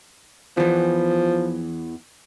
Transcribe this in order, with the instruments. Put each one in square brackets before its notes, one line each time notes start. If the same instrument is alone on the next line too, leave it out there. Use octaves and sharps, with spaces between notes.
[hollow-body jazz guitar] E2 E3 [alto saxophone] F3